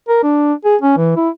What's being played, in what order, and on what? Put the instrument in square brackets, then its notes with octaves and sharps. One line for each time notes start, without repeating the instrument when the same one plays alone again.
[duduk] A#4
D4
G#4
C#4
E3
E4